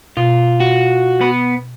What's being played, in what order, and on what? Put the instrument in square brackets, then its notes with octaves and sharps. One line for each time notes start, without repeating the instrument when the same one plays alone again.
[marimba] B2 [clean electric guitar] F4
[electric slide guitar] F#4
[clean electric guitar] B3 B5